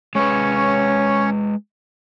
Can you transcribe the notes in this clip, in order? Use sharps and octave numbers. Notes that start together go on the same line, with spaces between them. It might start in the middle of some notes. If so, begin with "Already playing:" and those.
G#3 C#4 B4 C#5